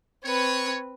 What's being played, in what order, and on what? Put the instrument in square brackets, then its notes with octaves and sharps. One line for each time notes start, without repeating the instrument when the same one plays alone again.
[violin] C4 B4 [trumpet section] C#5